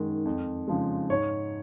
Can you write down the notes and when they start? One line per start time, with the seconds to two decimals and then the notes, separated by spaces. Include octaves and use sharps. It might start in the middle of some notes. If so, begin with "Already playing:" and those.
Already playing: F#2 D#3 G#3
0.25 F2
0.68 C#3 F3 G#3
1.10 G#2 C#5